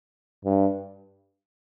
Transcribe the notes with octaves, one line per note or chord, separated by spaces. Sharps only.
G2